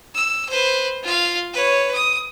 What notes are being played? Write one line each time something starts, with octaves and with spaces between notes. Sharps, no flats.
E6
B4 C5
F4 F5
B4 C#5
D#6